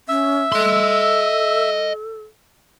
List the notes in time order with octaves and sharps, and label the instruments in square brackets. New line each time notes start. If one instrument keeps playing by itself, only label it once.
[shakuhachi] C#4 [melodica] E5
[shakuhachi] A4 [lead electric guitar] D#5 C6